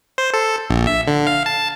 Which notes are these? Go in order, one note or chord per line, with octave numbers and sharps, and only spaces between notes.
C5
A4
A#1
E5
D3
F5
A5